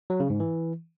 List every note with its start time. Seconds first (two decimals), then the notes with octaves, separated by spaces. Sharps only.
0.10 F#3
0.20 C#3
0.30 G#2
0.40 E3